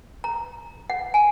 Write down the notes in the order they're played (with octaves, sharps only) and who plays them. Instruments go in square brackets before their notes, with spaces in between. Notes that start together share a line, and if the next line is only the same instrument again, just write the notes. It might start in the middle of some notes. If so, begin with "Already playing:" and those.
[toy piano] A#5
F#5
G#5